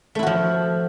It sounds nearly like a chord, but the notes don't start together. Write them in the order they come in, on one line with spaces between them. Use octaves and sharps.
A3 E4 F#4 F3